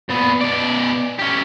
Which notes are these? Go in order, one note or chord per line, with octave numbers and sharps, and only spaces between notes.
A#2 B3
B2 D5
C#4 G4